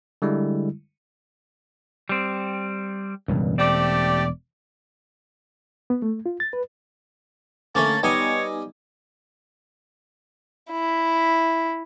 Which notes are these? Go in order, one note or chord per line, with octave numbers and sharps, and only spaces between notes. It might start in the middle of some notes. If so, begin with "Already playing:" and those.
D3 G3 G#3 E4
G3 C4
E1 C#2 G2
A3 C4 G4 D5
B3
A3
F4
A6
B4
D3 A3 A#3 C#4 A5
G3 B3 D#4 C#5 D#5 G#5
E4